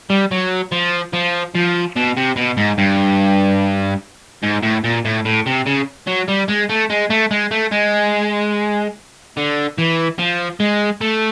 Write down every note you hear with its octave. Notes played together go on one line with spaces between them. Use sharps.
G3
F#3
F3
F3
F3
B2
C3
B2
G#2
G2
G#2
A2
A#2
A2
A2
C3
C#3
F#3
G3
G#3
A3
G#3
A3
G#3
A3
G#3
D3
E3
F3
G#3
A3